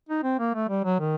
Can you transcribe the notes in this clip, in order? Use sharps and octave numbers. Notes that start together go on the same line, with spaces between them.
D#4
C4
A#3
A3
G3
F#3
D#3